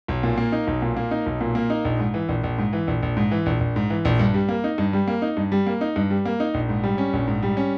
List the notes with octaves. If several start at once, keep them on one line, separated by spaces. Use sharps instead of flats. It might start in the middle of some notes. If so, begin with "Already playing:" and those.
B1
A#2
A#3
D#4
B1
A#2
A#3
D#4
B1
A#2
A#3
D#4
A#1
G#2
E3
A#1
A#1
G#2
E3
A#1
A#1
G#2
E3
A#1
A#1
G#2
E3
A#1
G2
G3
A#3
D#4
G2
G3
A#3
D#4
G2
G3
A#3
D#4
G2
G3
A#3
D#4
A#1
G#2
G3
C#4
A#1
G#2
G3
C#4